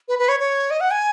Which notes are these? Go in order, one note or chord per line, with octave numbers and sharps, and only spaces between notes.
B4
B4
C#5
C#5
D#5
F#5
G#5